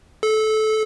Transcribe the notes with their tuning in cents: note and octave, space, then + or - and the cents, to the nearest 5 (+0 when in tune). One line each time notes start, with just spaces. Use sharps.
A4 -20